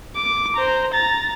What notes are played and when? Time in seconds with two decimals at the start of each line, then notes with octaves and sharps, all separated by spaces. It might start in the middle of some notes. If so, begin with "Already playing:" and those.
0.16 D6
0.56 C5 A#5
0.92 A#5 A6